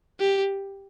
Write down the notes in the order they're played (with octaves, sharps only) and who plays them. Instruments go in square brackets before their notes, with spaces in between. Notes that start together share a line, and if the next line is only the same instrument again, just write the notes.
[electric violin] G4